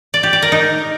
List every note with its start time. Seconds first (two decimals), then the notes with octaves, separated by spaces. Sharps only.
0.14 D5
0.23 G4
0.33 D5
0.42 A#4
0.52 D#4